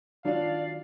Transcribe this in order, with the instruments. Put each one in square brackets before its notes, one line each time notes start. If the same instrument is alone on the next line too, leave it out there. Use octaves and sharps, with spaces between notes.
[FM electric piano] D#3 F4 [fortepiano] F#3 D4 [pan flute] D5 [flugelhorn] F5